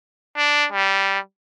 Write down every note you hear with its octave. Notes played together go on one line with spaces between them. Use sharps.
D4
G3